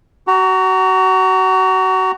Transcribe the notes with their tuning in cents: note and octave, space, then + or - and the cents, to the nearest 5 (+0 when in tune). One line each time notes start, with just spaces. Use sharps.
F#4 +30 A#5 -20